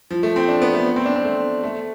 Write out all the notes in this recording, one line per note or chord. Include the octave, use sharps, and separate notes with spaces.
F3
A3
C4
D4
B3
A3
C4
D4
C4
A3
A3